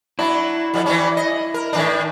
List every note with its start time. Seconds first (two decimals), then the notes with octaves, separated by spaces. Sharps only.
0.19 F#3 D4 E4
0.74 F2 G3
0.86 E3 G3 C#4
1.17 D#5
1.54 A#4
1.73 A2 D#3 D4